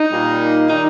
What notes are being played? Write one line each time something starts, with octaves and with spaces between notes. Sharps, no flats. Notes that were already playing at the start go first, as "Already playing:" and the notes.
Already playing: D#4
A#2 G3 A#3
D#3 G3 D#4